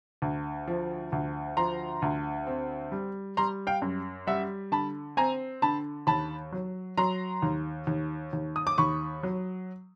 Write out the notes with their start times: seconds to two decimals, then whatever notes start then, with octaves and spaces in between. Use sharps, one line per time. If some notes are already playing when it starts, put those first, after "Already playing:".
0.22 D2
0.67 F3
1.12 D2
1.57 F3 A#5 C6
2.02 D2
2.47 C4
2.92 G3
3.37 G3 A#5 C6
3.67 F5 G5
3.82 F#2
4.27 G3 E5 F#5
4.72 D3 A5 B5
5.17 C4 G#5 A#5
5.62 D3 A5 B5
6.07 D#2 A5 B5
6.52 F#3
6.98 F#3 A#5 C6
7.42 D#2
7.87 D#2
8.33 D#2
8.56 D#6
8.67 D6
8.78 D#2 B5 C#6
9.23 F#3